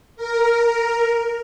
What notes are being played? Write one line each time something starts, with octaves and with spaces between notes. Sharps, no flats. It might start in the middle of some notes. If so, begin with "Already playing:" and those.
A#4